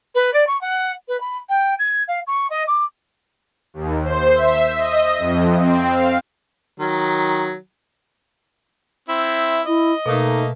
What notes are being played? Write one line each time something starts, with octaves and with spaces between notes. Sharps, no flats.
B4
D5
C#6
F#5
B4
B5
G5
G#6
F5
C#6
D#5
D6
D#2
C5
E5
D#5
F2
C4
F5
D#3 F#3
C4 E4 E5
E4 D#5
B2 A3 A#3 D#4